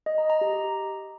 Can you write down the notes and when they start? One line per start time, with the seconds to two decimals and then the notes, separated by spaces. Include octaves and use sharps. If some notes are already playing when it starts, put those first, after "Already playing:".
0.06 D#5
0.18 A#5
0.30 A#5
0.41 G4